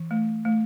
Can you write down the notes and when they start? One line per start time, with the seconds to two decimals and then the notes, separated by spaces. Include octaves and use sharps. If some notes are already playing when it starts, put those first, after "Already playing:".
Already playing: E3
0.11 A3
0.45 A3